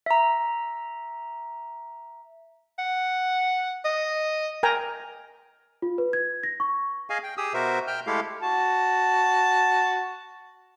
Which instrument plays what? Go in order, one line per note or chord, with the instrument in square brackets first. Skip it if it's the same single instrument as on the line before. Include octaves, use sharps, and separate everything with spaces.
[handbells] E5 A#5
[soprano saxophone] F#5
D#5
[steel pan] A#4 G5 G#5 A#5
[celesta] F4
B4
G#6
A#6
C#6
[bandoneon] G#4 D#5 F5 G#5
G5
G4 G#4 D#6 E6
B2 F#4 A#4 C5 E5
G5 F6 G6
G#3 A3 E4 G4 A4 F5
[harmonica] F#4 A5